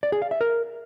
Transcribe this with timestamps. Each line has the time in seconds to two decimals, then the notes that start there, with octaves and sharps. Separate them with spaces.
0.03 D5
0.12 G#4
0.22 F5
0.31 E5
0.41 A#4